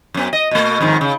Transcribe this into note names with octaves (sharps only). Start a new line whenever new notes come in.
F#2 B3
D#5
B2 A3
F2 G#2 D#3
C#3